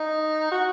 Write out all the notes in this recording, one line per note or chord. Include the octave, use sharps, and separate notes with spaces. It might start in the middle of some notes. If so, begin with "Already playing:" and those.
Already playing: D#4
F#4